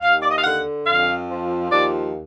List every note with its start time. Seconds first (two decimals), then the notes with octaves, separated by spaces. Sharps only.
0.01 D#2 F5
0.21 D5
0.28 D#5
0.36 F5
0.43 D3 F#5
0.85 F2 F5
1.28 F3
1.70 D#2 D5